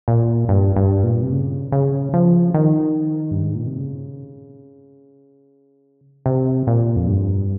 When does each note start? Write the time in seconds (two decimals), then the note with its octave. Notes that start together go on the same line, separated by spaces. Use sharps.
0.08 A#2
0.49 G2
0.76 G2
1.04 A#2
1.22 C3
1.32 C#3
1.72 C#3
2.14 F3
2.54 D#3
3.31 G2
3.43 G#2
3.55 A#2
3.66 C3
3.79 C#3
6.26 C3
6.67 A#2
6.96 F2
7.08 G2